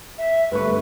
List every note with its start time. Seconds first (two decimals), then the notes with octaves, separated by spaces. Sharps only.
0.18 E5
0.51 G1 A3 B4 C#6